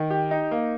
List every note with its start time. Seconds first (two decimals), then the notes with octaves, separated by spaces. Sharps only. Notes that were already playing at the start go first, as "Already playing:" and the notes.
Already playing: D#3
0.10 G4
0.31 D#4
0.51 A#3